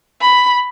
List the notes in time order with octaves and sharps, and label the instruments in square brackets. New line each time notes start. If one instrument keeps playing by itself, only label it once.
[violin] B5